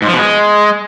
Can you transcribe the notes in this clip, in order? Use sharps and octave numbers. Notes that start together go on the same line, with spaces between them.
G#2
F3
B2
G#3